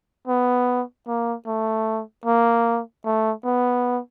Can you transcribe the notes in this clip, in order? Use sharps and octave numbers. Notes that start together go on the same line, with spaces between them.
B3
A#3
A3
A#3
A3
B3